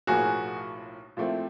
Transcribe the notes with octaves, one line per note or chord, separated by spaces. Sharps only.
B1 A2 F3 A#3 F#4 G#4
A#2 F3 A3 C4 E4